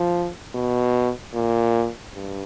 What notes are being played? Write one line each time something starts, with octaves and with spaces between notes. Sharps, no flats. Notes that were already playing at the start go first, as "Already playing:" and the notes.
Already playing: F3
B2
A#2
G2